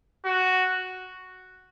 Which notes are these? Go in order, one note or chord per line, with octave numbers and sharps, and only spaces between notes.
F#4